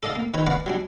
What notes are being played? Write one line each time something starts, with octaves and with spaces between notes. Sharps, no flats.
A4 D5 D#5 F5 A5
A#3
D#3 B4 C#5 A#5
B4 D5 F5 F#5 A#5 C#6
F#3 G3 D4